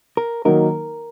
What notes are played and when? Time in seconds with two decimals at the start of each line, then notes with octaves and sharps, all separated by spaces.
0.17 A#4
0.45 D#3 F#3 A#3 D#4 A#4